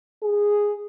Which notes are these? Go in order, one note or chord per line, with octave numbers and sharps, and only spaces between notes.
G#4